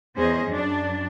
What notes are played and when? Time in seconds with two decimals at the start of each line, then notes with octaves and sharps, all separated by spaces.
0.15 E2 C#4 G#4 C5 D#5
0.48 F#2 D4